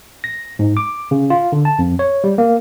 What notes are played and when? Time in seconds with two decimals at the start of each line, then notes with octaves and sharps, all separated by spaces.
0.24 A#6
0.59 G#2
0.77 D6
1.11 C#3
1.30 F4
1.52 D3
1.65 A5
1.79 F2
1.99 C#5
2.24 G3
2.38 A#3